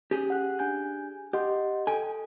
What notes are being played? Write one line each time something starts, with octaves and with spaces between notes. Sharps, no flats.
C#4 G4 G#4
F#5 F#6
D4 G#5 G6
G4 D#5 F#5 C6
A4 G5 G#5